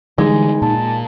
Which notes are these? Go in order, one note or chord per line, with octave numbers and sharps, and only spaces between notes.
D3 E3 G3 G#3 D#4
A#2 A5